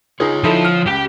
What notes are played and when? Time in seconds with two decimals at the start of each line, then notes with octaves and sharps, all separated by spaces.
0.20 D#4 F4 G#4 C#5
0.44 F3 D#4 E4 A4
0.65 F6
0.86 C#2 G4 G5